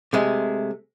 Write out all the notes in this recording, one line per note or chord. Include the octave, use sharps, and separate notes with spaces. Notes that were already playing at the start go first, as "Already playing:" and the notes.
C3 G#3 A3